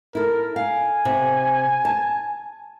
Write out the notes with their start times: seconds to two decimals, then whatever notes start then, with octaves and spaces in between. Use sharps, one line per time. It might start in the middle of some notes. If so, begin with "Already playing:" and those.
0.15 E4 A4 A#4
0.56 F5 G#5
1.05 C3
1.85 A5